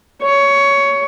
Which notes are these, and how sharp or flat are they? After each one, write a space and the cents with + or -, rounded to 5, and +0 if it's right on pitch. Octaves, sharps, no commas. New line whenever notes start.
C#5 +15